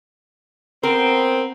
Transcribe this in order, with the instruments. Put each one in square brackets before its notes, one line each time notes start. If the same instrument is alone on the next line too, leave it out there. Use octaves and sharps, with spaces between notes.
[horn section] B3 C4 [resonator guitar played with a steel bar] A#4